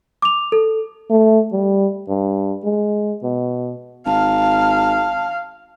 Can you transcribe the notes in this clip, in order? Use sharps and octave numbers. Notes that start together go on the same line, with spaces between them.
D6 F7
A4
A3
G3
G2
G#3
B2
G#1 F5 A5